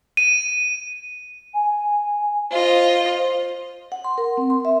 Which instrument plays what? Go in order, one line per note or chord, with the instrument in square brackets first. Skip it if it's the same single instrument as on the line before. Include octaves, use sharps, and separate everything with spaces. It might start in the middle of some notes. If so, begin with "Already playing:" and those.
[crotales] D#7
[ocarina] G#5
[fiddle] F4 D#5 [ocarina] C5
[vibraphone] F#5
C6
A#4
C4
C6
E5